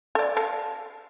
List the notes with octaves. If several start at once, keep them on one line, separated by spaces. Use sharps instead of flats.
A4 D5
A4 F5 A5